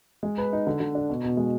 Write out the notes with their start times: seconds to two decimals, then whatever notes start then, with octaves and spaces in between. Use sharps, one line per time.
0.23 G#3
0.38 B4
0.53 D#4
0.67 D3
0.80 D3
0.95 D4
1.10 B2
1.24 B2
1.37 G#3